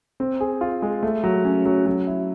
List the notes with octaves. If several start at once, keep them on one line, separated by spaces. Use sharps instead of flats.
C4
G#4
F4
G#3
A3
F#3
C#4
F#3
F#3
E4